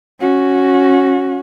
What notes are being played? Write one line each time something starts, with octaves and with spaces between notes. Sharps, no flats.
C#4 F#4